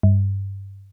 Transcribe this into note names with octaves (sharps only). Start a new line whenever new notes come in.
G2